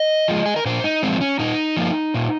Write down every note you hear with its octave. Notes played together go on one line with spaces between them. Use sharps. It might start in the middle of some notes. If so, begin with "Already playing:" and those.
Already playing: D#5
F3 G#3
G#4
A#4
A#2 C5
D#4
F3 G#3 C4
C#4
A#2 D#4
F3 A#3
A#2